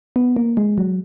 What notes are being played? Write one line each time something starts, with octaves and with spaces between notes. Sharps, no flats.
B3
A#3
G#3
F#3